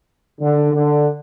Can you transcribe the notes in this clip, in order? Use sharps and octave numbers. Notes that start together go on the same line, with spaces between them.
D3
D3